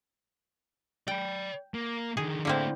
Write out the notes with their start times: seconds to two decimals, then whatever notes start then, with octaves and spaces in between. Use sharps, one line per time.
1.08 D5 G5 B5
1.74 A#3
2.17 D3 D#3 G#4
2.45 D3 A3 A#3 C4 E4